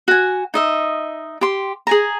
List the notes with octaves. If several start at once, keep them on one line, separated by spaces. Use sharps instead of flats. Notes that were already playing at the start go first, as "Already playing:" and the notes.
F#4 G#5
D#4 D#5 E5
G4 C6
G#4 G#5 A#5